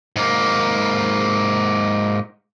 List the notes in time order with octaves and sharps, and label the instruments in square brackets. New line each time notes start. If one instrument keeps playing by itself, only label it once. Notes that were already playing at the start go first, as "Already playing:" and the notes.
[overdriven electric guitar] G#2 A#3